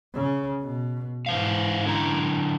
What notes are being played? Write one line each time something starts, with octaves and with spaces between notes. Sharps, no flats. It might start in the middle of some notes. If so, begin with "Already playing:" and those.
C#3
B2
G#2 E3 B4 C5 F5
D3 E4 A#5